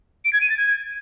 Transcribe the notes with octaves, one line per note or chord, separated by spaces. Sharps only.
D7
G#6
D#7
A6
G#6